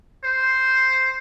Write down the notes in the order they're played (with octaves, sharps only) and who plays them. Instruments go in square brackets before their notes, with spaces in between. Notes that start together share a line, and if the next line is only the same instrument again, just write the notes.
[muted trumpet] C5